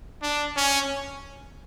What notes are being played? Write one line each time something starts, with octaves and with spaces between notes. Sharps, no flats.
D4
C#4